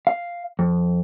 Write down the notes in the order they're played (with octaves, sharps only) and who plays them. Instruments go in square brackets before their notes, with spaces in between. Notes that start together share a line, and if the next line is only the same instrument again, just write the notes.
[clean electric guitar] F5
F2